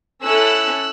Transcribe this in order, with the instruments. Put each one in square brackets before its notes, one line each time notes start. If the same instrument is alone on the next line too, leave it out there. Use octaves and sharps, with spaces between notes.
[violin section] C#4 E4 A4 E6 F#6